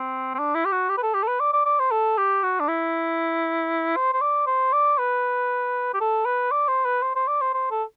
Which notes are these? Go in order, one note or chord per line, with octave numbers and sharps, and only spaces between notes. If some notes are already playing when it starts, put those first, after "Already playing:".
Already playing: C4
C4
D4
E4
G4
F#4
G4
B4
A4
G4
A4
B4
D5
D5
D5
C5
A4
G4
F#4
D4
E4
C5
C5
D5
C5
D5
B4
G4
A4
B4
D5
C5
B4
C5
C5
D5
C5
C5
A4